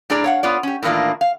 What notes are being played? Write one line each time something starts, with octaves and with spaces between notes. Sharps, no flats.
A2 D4 G#4 D5 A#5
C#5 F5 F#5
B3 F4 C#5 D5
C#4 G4
A2 D#3 E3 A#3 D4 F4
F5